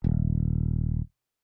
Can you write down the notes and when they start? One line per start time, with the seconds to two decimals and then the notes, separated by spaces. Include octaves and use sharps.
0.04 D#1